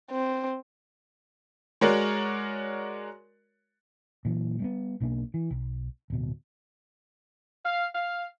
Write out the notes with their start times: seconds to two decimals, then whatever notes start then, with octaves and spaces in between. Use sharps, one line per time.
0.11 C4
1.81 G#3 F#4 A#4 C#5 D5
4.25 A#2 E3 F#3
4.60 G3 A#3 B3
5.00 B1 B2 A#3 D4
5.34 E3
5.51 B1
6.10 D1 B2
7.65 F5
7.95 F5